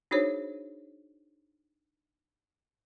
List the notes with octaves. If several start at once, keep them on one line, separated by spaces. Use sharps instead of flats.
D4 D#4 F#4 G#4 C5 C#5